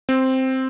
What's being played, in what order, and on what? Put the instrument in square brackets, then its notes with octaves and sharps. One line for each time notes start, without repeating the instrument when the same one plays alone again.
[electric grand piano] C4